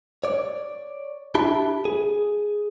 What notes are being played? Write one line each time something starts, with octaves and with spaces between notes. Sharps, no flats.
C#5 D5
D4 E4 G4 E5 A5 B5
G#4